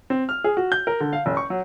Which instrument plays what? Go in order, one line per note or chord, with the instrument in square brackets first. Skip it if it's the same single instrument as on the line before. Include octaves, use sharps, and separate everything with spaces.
[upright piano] C4
F6
G#4
F#4
G6
A#4
D3
F5
F#1
C#6
F#3